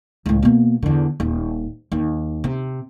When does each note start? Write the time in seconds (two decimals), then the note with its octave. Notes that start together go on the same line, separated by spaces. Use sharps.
0.26 C#2 A2
0.43 B2 A#3
0.82 E2 D3
1.20 D#1
1.92 D#2
2.44 C3